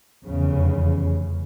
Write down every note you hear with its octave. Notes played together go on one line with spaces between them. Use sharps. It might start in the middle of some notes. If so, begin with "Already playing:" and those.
F1 E2 C#3